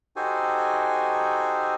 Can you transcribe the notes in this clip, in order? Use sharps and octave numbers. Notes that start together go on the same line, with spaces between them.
D#4 F#4 G4 A4 C5 G#5